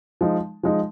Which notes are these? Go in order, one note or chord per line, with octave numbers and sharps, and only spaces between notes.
F3 G#3 D#4
F3 G#3 D#4